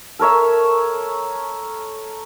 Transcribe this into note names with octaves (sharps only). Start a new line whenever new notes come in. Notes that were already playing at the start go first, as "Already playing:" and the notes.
A4 A#4 C#5 E5